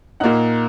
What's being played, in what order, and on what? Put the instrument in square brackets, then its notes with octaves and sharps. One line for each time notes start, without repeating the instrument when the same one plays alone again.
[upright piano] A#2 A#3 D#4 F#5 F#6